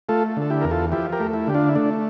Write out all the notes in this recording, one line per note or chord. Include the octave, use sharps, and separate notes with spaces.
A3 F4 A4
D3 A4
E4 G4
E2 A#4
F4 A4
F3 E4 G4
G4 A#4
A3
E4
D3 G4
D4 F4
E4
A3 D4